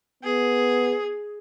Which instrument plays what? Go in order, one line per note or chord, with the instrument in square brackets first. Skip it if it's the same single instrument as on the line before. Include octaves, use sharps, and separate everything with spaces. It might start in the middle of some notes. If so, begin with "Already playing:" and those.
[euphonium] B3 [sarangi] G#4